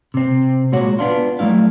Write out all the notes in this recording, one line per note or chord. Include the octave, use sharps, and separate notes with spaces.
C3 C4
A#2 G#3 F#4 C#5 F#5
B3 D4 F4
F#3 G3 A3 E4 F5